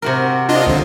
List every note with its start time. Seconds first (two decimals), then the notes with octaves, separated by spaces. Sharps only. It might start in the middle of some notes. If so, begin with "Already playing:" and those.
0.02 C3 F#4 A#4
0.49 D4 F4 D#5
0.67 C#2 D3